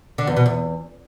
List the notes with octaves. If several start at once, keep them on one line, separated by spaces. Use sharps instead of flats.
D3
E2
B2
E2